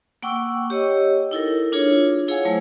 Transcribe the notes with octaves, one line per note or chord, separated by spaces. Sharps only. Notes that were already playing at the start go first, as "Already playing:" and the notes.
A#3 F#5 G5 C#6 D6 E6
G4 C#5 D#5 E6
D#4 E4 A4 A#4
D4 F4 G#4 C#5
E4 G#4 C#5 F5 F#5 G#5
F#3 A3 E4 C5 G#5